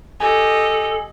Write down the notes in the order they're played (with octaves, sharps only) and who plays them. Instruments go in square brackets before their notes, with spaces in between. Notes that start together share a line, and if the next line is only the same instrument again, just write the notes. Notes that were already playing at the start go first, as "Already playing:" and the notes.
[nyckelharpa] G4 D#5 [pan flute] A4 [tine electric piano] G#5